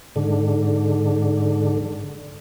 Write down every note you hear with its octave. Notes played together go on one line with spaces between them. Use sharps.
G#2 D3